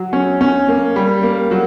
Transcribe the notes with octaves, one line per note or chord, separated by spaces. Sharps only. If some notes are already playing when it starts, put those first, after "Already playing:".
Already playing: F#3
C#4
C#4
A#3
G3
A#3
F#3